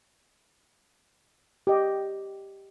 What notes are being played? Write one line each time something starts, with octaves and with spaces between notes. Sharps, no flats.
G4 D#5